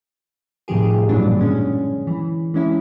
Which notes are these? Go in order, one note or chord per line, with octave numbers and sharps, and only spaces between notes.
A2 C3 D#3 F3 G4 G#4
G2 A#2 E3 F#3 G#3 D4
D3 G#3 C#4
E3
E3 G#3 C#4 E4